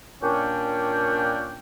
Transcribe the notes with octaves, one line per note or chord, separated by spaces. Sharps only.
A#2 C#4 D4 G5